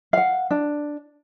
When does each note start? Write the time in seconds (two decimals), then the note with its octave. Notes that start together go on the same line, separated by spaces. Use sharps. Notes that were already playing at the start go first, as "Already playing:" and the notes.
0.13 F5 F#5
0.51 D4